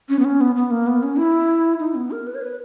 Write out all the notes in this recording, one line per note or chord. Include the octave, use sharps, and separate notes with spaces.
C#4
B3
C#4
B3
B3
A#3
B3
C#4
E4
D#4
B3
A#4
B4
C#5
B4